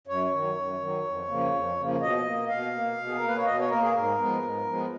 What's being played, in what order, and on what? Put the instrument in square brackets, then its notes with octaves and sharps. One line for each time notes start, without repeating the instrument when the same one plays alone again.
[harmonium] F#2 C#5
D#3 F#3
F#2
D#3 F#3
F2
C#3 F3 A#3
F2
C#3 F3 A#3
B2 D#5
A#3
B2 F5
A#3
B2
G#4
A#4
A#3 B4
C#5
B2 D#5
C#5
A#3 A#4
G#4
G#2 A#4
F3 G#3 B3
G#2
F3 G#3 B3